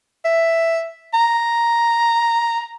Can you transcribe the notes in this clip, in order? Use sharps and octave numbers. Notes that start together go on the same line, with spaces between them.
E5
A#5